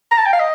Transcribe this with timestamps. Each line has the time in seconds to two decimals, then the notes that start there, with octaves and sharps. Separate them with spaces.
0.11 A#5
0.18 A5
0.26 G5
0.33 F5
0.40 D#5